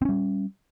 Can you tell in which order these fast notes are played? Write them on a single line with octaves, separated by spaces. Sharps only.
C4 C#4 G3